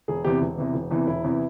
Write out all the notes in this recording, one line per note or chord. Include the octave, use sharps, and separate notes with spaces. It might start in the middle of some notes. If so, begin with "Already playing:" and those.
E1 G#4
E2 C3 E3 G4
E1
E2 C3 E3
E1
E2 C3 E3
E1 E4
E2 C3 E3